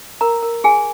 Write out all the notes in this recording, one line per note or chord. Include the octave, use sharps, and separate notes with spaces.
A#4 A#5
A#4
F4 G#4 G#5